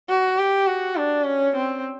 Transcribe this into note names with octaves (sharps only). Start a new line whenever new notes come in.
F#4
G4
F#4
D4
C#4
C4